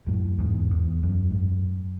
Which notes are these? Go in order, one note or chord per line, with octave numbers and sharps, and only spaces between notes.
F#2 A2
E2 G#2
E2
F#2
G#2
F#2